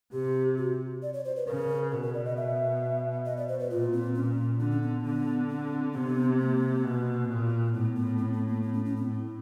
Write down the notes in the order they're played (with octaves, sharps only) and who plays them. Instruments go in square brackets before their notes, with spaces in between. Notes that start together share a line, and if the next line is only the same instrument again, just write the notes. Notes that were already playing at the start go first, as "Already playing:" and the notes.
[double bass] C3 [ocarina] G4
[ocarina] F#4
D5
C#5
C5
B4
[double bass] C#3 [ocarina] A#4
[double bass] B2 [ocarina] A#4
[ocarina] A#4
D5
D#5
E5
D#5
D5
C5
B4
[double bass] A#2 [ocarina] F4
[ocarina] C4
C#4
[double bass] D3 [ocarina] D4
[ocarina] C#4
B3
[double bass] D3 [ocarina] B3
[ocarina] C4
[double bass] C3 [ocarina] B3
[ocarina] A#3
[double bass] B2
A#2
[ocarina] A#3
[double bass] A2 [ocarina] B3
[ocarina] B3
C4
B3
A#3
B3
C#4
C#4
C4
[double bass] A2